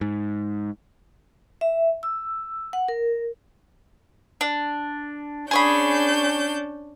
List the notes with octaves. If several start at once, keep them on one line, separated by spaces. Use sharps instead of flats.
G#2
E5
E6
F#5
A#4
D4
C#4 D4 G#4 C#5 B5 G6